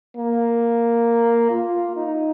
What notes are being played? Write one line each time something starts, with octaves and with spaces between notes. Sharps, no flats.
A#3
F4
D#4